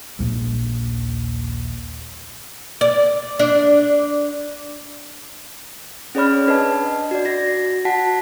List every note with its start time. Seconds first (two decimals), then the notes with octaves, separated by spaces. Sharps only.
0.19 A#1 D#2
2.81 D5
3.39 D4
6.15 C#4 G#4 C#5 D5 B5 F6
6.47 D4 B4 D#5 A5
7.11 F#4 D5
7.25 F#4 A#6
7.85 F#4 F#5 A5 B6